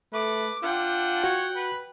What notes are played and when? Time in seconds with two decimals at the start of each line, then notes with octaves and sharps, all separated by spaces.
0.13 A3 B4 D6
0.63 D4 F4 F#5 G5
1.24 F#4 C#5
1.56 B4